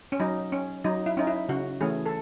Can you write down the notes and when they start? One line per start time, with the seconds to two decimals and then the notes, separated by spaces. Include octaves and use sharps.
0.12 C#4
0.20 F#3 D#4
0.52 C#4
0.84 F#3 D#4
1.06 E4
1.17 C#4 D#4
1.27 E4
1.49 C#3 F#4
1.81 E3 A3 C#4 G#4
2.06 A4